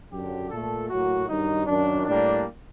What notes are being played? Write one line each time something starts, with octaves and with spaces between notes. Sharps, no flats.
F#2 D3 F#3 G4
A#2 A3 A4
A2 F#3 A#3 F#4
G2 D#3 F#3 D#4
F#2 D#3 F#3 D4
A2 G3 A#3 D4